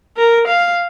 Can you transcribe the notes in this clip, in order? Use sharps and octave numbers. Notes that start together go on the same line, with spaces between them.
A#4
F5